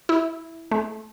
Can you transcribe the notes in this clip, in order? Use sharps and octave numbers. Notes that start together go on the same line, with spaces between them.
E4
A3